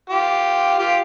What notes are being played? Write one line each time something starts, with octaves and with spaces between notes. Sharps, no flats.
F4 G4
F4 G4